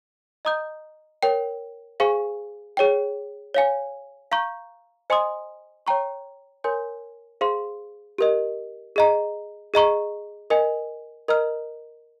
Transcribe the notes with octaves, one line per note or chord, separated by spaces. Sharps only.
D#5 A#5 D#6 G6
A#4 C#5 G5
G#4 C5 F5 G#5 C#6
G#4 C#5 G5
C#5 F5 G#5
F5 A#5 C#6 G6
C5 D#5 G#5 C6 D#6
C#5 G5 A#5 C#6
A#4 C#5 G#5 C6 G6
G#4 C5 F5 C6
G4 A#4 D#5
G#4 D#5 A#5
G#4 D#5 A#5 C#6
A#4 D#5 G#5
A#4 D#5 A#5 F6